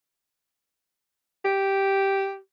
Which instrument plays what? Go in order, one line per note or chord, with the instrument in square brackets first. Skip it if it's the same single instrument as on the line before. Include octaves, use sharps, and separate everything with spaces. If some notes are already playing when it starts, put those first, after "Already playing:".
[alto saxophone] G4